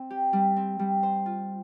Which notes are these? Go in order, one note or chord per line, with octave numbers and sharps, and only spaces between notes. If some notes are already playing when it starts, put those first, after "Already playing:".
Already playing: C4
G4
G3
C4
G3
C5
F4